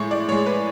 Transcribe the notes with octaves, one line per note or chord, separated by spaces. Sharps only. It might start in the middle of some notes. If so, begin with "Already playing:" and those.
Already playing: A2 G#3 C#6
D5
A2 G#3 C#5
B4